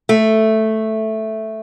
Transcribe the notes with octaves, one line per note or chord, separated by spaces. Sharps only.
A3